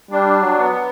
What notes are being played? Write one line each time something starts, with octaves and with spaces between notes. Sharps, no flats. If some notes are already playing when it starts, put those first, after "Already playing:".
G3 D4
F#3
B3